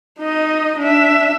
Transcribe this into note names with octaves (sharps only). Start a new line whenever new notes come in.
D#4 D#5
D4 E5